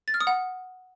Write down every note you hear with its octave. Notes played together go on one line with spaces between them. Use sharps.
A6
F6
D#6
F#5